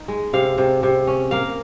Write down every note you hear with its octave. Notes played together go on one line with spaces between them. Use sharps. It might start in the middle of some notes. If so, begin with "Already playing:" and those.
Already playing: D#4
G#3
C3 F5
C3
C3
C#4
A#3 F5